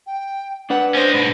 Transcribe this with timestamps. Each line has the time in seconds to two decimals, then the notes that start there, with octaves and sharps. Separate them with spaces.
0.07 G5
0.70 D4 B4 F#5
0.95 C#4 C5 D#5
1.13 G#2 B2 B5